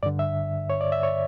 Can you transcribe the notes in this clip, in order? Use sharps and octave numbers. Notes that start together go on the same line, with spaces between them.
G2 D3 D5
E5
C#5
D5
E5
C#5